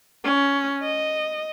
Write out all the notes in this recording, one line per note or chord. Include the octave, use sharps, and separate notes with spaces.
C#4
D#5